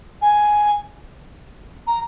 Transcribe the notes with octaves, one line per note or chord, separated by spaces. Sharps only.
G#5
A#5